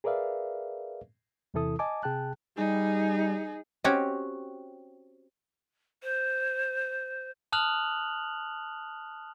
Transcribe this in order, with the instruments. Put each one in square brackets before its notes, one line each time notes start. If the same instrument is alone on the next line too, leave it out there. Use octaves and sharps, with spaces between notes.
[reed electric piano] G#4 A#4 B4 D5 E5 F5
E2 C3 E3 E4 A4 D#6
D#5 G#5 A5 D6
C3 G#4 G5 A5 F#6
[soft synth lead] G3 [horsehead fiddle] D#4 G#4
[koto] C4 C#4 F#4 G4 C#5
[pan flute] C5
[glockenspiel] A5 D#6 F6 F#6 F7 F#7